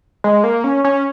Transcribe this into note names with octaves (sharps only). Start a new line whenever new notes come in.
G#3
A#3
C#4
C#4